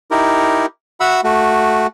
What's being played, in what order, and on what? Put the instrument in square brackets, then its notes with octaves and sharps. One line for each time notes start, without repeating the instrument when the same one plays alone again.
[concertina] D#4 E4 G4 A#4
F#4 E5 F#5 B5 E6
A3 F#4